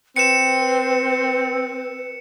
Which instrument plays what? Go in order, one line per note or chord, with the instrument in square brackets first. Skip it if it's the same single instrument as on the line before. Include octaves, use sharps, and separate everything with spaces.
[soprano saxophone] C4 [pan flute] B4 [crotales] C#7 E7